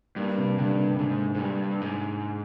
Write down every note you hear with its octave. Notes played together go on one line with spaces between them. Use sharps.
G2 A#3
C3
G2 D3
C3
G#2 D3
G#2
G2
G#2